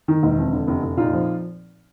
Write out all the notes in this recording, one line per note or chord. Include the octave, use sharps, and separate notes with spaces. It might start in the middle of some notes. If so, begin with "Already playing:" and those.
D#3
E1
F2
D3
F1
F1
A#2 D#4 F4
F3